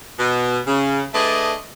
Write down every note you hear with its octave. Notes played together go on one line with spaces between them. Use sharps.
B2
C#3
A3 D4 G#4 B4 D5 D#5